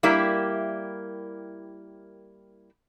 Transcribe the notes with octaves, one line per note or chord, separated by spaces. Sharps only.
G3 A#3 E4 G4 A#4 E5